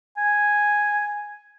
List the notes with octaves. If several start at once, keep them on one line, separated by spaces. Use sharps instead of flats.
G#5